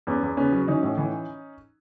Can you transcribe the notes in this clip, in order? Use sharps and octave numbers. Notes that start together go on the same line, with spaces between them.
E2 B3 C#4
E2
C#3 B3 C#4
F#3
E3 C#4 D#4
A2
E3